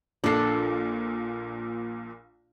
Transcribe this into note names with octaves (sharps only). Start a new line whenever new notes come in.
A#1 A#2 D4 A4 C7